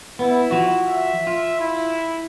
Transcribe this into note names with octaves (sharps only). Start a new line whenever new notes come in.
B3 E4
F3 F#4
E5
F4
E4